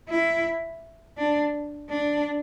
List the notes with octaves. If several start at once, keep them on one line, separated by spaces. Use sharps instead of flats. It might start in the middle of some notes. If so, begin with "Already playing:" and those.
E4
D4
D4